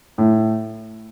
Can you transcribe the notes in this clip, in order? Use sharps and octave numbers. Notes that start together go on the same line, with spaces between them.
A2